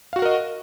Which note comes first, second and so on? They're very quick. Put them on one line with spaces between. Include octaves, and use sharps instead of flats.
F5 F#4 F#5 A#4 D#5